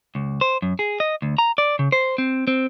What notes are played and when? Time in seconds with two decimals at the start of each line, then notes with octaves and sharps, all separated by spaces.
0.15 C#2
0.41 C5
0.62 F#2
0.79 G#4
1.00 D#5
1.22 D2
1.38 A#5
1.58 D5
1.79 C#3
1.92 C5
2.18 C4
2.47 C4